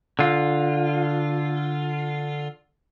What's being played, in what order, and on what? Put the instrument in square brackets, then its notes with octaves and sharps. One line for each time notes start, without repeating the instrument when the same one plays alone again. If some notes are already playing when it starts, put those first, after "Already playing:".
[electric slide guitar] D3 F4